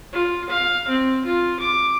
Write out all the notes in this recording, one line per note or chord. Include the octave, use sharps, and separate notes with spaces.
F4
F5
C4
F4
D6